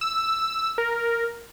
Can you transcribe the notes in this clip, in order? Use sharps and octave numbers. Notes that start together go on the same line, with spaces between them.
E6
A#4